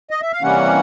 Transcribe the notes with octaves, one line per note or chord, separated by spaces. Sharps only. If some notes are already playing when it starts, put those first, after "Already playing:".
D#5
E5
F5
C3 E3 G3 A#3 C#4 F#5